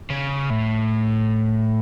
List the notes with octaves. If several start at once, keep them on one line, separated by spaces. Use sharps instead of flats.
C#3
A2